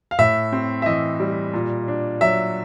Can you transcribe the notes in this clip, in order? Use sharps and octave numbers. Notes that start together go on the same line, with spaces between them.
F5
A2 E5
C4
E5
E3 D#5
G3
A#2
D4
F#3 E5